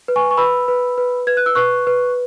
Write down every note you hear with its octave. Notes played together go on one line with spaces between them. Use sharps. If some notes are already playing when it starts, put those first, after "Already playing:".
B4
G#5 C#6
C#6
B4 B5 E6
B4
B4
B4 G#6
F#6
E6
B4 C#6 F#6
B4